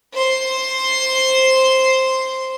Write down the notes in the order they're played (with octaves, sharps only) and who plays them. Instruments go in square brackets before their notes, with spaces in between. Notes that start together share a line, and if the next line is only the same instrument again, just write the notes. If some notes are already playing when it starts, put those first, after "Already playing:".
[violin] C5 C6